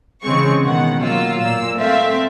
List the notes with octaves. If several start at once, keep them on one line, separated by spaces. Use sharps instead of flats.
C#3 E3 G#3 C4 C#6
B2 D#3 F#5
F#3 A#3 F4 E6
A#2 A#3 E6
A3 C4 E5 F5